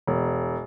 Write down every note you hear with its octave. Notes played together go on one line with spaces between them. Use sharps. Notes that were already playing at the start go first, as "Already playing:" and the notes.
E1